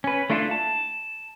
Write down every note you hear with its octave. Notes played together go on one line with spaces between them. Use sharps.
C#4 B4
A3 D4 E4 F4 A4
A5